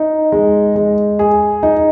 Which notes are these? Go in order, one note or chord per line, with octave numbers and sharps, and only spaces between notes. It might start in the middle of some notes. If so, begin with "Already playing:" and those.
Already playing: D#4
G#3
G#3
G#4
D#4